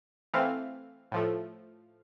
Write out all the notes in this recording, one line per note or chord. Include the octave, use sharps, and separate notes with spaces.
E3 A3 C4 F5
A2 F3 A3